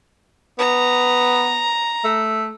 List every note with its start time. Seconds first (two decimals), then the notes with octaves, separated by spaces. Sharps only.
0.59 B3 A#5
2.04 A3